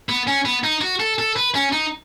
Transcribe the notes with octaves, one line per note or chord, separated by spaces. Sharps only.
B3
C#4
B3
D#4
F#4
A4
A4
B4
C#4
D#4